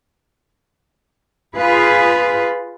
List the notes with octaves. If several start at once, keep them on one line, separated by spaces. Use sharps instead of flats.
F4 G#4 B4 F5